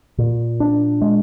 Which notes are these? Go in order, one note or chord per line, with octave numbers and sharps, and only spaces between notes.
A#2
D4
G#3